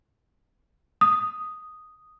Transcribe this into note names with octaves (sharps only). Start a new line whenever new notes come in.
D#6